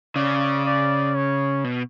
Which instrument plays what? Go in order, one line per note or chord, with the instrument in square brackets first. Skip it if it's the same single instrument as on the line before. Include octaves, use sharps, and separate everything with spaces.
[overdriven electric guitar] C#3 [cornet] D5
[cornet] D5
C#5
[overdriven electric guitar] B2